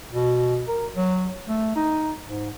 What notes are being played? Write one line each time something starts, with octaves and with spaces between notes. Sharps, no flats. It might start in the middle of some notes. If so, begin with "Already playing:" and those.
B2
A#4
F#3
A3
D#4
G#2